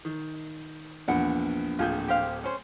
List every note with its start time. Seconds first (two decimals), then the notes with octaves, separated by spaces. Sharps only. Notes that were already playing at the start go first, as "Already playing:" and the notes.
0.05 D#3
1.08 A#1 E2 F#5
1.79 D1 F4 G#4 G6
2.08 G4 C5 F5
2.44 C#4 G#4 C5